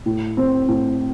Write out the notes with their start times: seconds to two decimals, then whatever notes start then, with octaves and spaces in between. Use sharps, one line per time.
0.06 A2
0.37 C4
0.68 A2